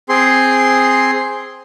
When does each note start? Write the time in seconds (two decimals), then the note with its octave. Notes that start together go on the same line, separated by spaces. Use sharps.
0.09 C4 G#4 C6